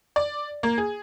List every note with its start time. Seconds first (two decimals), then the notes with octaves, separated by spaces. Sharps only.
0.16 D5
0.63 A#3
0.78 G#4